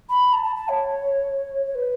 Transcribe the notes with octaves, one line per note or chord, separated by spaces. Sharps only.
B5
A5
A5
A5
C#5
C#5
B4